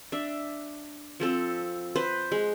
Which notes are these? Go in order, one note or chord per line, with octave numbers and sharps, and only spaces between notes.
D4 E5
F3 C4 A4
B4 C5
G#3